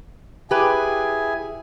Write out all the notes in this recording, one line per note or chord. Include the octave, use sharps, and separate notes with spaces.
E4 G4 G#4 B4 G#5